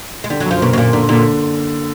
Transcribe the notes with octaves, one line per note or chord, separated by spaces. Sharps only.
G#3
D3 G3
F#3
F#2 F3
B2 A#3
B2
A#2 A#3
A#2 D3
A#2 D3